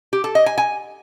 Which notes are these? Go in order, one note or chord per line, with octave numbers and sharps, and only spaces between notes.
G4
A4
D#5
G#5
G#5